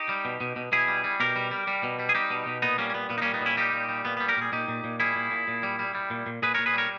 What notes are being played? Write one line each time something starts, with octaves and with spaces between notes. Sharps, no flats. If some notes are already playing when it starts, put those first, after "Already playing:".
Already playing: D#4 G4
G3
B2
B2
B2
B2 E4 G#4
G3
G3
B2 G4 A#4
G3
G3
G3
B2
G3
G#4
G3 D#4 G4
B2
B2
A#2 B3 D#4
G3 A#3 C#4
C#4
A#2 B3
A#2 B3
D#4
G3 A#3 C#4
B3 D#4
A#2 C#4 E4
G3 D#4 G4
A#2
G3
A#2 B3
G3 B3
G4 A#4
A#2 G#4
A#2 D#4 G4
A#2
A#2
G3 E4 G#4
A#2
A#2
A#2
G3
G3
G3
A#2
A#2
A#2 G#4 B4
A#2 A#4 C#5
G#4 B4
G3 A#4 C#5